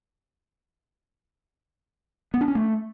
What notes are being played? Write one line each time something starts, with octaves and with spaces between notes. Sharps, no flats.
B3
D4
C#4
A3